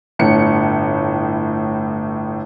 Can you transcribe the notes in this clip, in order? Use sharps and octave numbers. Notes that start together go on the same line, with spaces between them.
G1 A2 C#7